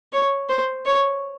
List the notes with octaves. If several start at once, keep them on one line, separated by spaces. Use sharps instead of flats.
C#5
C5
C#5